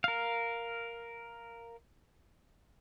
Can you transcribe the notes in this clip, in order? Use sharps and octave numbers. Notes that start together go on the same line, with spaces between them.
A#4 F5